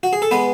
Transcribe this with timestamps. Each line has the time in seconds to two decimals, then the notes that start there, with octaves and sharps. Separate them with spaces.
0.03 F#4
0.13 G#4
0.22 A4
0.31 G#3 B3 B4